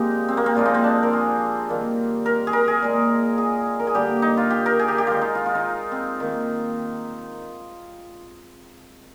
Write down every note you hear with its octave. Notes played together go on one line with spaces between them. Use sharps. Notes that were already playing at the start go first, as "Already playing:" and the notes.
Already playing: A#2 F3 G#3 A#3 C4 D#4 G4
C4
A#3
C4
A#2 F3 G#3 F4
D#4
C4
D4
A#4
G#4
D#3 G3 A#3
A#4
G#4
A#4
G#4
A#2 G#3
G#4
A#4
G#4
D3 G3 A#3 G4
D#4
F4
G4
A#4
G#4
G4
G4
D#3 G#3 F4
D#4
F4
F4
D#4
C4
D#3 A#3